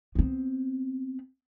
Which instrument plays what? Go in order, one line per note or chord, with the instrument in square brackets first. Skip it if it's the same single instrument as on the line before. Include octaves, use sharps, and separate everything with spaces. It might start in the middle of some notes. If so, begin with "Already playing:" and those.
[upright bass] B3 C4